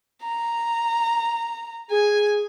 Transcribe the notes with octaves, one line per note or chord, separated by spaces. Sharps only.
A#5
G#4 G#5